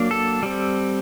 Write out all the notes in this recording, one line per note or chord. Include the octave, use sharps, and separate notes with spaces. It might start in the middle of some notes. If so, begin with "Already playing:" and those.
Already playing: F#3 A#3 D4
A4
G3 C4